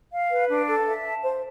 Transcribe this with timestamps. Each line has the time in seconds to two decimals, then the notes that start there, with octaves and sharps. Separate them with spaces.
0.12 F5
0.30 B4
0.49 D4
0.67 A4
0.86 E5
1.04 A5
1.22 C5